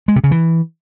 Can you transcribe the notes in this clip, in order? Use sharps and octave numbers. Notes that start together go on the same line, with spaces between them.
G#3
C3
C#3
E3